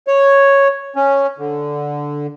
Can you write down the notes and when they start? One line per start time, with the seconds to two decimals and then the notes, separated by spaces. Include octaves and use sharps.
0.07 C#5
0.96 C#4
1.38 D3